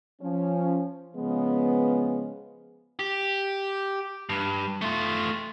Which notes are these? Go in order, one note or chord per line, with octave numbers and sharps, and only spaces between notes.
F3 C#4
C#3 F3 G#3 B3
G4
G2
A3 F4